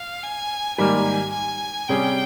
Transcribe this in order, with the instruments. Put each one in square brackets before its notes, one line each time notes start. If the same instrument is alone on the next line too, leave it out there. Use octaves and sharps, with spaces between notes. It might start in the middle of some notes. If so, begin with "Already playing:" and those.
Already playing: [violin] F5
G#5
[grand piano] G#2 D#3 G3 A#3 [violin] G#5
[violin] G#5
[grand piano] C3 G3 C#4 G#4 [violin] G5